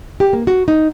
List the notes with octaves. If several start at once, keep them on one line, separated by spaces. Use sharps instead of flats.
G4
A#3
F#4
D#4